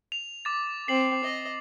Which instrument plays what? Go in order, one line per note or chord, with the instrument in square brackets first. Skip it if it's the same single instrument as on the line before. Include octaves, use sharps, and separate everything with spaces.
[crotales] F7
D6 A6
[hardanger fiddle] C4 [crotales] C7 F#7
[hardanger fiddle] D#5